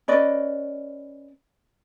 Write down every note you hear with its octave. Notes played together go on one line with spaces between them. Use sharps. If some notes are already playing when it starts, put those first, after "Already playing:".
C#4 B4 D5 D#5